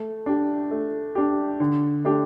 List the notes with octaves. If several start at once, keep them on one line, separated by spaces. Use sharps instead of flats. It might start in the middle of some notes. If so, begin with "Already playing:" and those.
Already playing: A3
D4 G4
A3
D4 G4
D3
A3 D4 G4